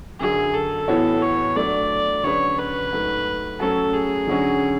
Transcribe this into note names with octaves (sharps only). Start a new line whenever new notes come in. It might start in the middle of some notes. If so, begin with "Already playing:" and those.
F#2 D3 F#3 G#4
A4
A2 E3 B3 F#4 C#5
C#5
F#3 A3 D4 D5
D3 F#3 C#4 G#4 B4 C#5
B4
G#2 F#3 A3
F#3 A3 C#4 A4
G#4
D3 F#3 C#4 F#4